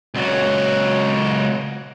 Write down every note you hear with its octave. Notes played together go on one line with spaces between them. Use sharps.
C#2 F#3